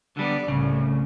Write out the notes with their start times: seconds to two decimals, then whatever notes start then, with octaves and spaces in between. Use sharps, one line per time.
0.17 D3 G3 B3 D5
0.48 C2 A2 C#3